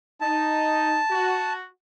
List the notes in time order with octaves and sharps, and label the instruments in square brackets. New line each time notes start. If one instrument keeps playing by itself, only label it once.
[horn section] D#4 [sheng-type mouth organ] A5
[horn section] F#4